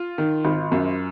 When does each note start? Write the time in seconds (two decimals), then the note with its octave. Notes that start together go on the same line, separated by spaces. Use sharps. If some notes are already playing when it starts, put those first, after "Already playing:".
Already playing: F4
0.18 D#3
0.45 G#1
0.72 F#2